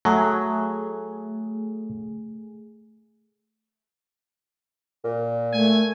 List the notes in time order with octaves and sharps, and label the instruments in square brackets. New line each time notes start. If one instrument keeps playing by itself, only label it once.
[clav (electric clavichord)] F#3 [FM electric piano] A3 G#4
[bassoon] A#2
[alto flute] A3 [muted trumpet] G#5